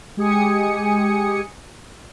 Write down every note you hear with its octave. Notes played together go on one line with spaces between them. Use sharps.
G#3 G4 G#5 D#6 C#7